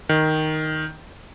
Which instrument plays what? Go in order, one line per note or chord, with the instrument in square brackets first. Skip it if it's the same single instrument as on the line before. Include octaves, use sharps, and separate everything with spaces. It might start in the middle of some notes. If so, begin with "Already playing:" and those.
[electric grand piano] D#3